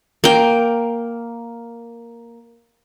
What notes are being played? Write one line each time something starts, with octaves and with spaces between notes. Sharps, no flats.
A#3 G5